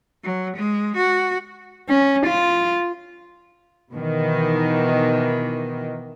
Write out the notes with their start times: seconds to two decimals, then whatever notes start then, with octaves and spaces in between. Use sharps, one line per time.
0.24 F#3
0.56 G#3
0.96 F#4
1.89 C#4
2.26 F4
3.93 B2 D#3 E3